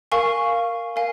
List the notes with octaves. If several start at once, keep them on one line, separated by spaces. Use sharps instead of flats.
A#4 F5 G#5 C#6
A#4 F5 G#5